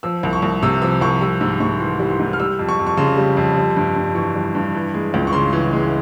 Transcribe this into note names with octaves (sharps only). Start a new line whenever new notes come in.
F3 E6
C2
C#6
C2
C3 E6
F3 E6
C2 C#6
G3 E6
G#2 E6
G#2 C#6
E3 C6
G3
C6
G#2
F6
G3 E6
F2
C#6
F2
C#6
C#3 C6
G3
F2
G3
G2
G2
E3 C#6
G3
G2
E3
G#3
C#2
C#6
C#3 C6
E3
G#3